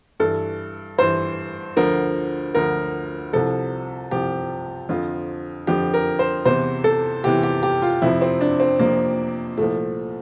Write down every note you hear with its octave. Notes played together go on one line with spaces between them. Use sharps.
G2 E3 A4
G2 E3 C5
D2 D3 F3 A#4
D2 D3 F3 A#4
C2 C3 F3 A4
C2 C3 F3 G4
F2 D3 F3 F4
F2 D3 F3 G4
A#4
C5
E2 C3 E3 C5
A4
E2 C3 E3 G4
G4
G4
F4
F2 C3 F3 E4
C4
D4
C4
F2 C3 F3 A#3
C2 A#2 F3 A3